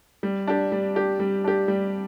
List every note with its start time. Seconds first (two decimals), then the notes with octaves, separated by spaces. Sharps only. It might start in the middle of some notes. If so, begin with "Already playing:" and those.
0.23 G3
0.47 D4 G4
0.72 G3
0.95 D4 G4
1.20 G3
1.44 D4 G4
1.68 G3